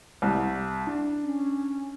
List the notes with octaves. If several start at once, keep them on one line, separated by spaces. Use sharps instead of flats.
C2
D4
C#4